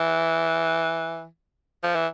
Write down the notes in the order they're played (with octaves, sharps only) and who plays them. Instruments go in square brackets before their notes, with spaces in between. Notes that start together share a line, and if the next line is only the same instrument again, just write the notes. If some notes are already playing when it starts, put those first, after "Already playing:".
Already playing: [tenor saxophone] E3
F3
E3